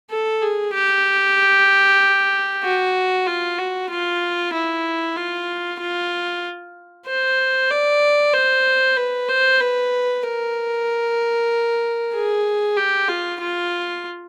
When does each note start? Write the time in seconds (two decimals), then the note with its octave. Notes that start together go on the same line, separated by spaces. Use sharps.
0.10 A4
0.42 G#4
0.74 G4
2.64 F#4
3.27 F4
3.59 F#4
3.90 F4
4.53 E4
5.17 F4
5.80 F4
7.07 C5
7.70 D5
8.33 C5
8.97 B4
9.29 C5
9.60 B4
10.23 A#4
12.14 G#4
12.77 G4
13.08 F4
13.40 F4